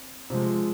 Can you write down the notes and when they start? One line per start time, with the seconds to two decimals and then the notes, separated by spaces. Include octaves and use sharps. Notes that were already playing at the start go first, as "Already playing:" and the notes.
Already playing: C4
0.30 C3 F3 G#3